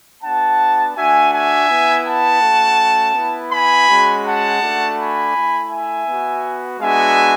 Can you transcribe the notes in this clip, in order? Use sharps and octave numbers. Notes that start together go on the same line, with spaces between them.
B3 D4 F#4 F#5 A5
A3 D4 F#4 E5 G#5
E5 G#5
B3 E4
F#5 A5
A3 C#4 F#4
B3 E4
G#5 B5
G#3 C#4 F#4
F#5 A5
A3 D4 F#4
G#5 B5
A3 E4
E5 G#5
B3 F#4
G#3 B3 D4 F#4 E5 G#5